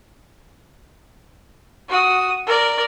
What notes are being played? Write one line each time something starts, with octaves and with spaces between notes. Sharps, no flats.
F#4 D#6
A#4 D5